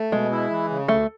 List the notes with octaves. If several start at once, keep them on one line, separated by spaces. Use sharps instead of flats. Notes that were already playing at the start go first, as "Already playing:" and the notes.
Already playing: A3
B2 G#3
E4
E3
C#3
D2 A3